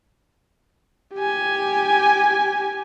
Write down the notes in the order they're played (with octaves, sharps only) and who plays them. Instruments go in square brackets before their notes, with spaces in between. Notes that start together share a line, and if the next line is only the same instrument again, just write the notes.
[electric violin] G4 G#5